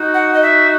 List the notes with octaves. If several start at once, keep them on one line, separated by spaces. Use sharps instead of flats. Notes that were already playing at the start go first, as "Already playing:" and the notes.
Already playing: D#4 F#4
F#5
D#5
E5